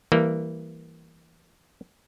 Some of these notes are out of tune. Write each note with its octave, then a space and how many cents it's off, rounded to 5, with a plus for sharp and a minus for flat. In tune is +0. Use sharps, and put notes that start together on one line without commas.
E3 +0 G3 +0 A#3 -15